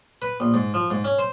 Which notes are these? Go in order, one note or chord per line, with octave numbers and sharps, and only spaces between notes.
B4
A#1
G#2
F3
G#2
C#4
C5